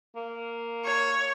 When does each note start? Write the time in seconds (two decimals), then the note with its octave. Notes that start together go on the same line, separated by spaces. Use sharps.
0.16 A#3
0.85 C#5